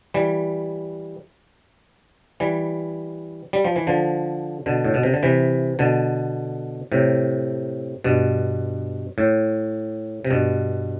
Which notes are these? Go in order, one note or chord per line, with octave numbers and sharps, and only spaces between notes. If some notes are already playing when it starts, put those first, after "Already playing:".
E3 G3
E3 G3
G3
F3
E3
D3 F3
B2 D3
A2
B2
C3
D3
C3 E3
B2 D3
A2 C3
G2 B2
A2
C3
G2 B2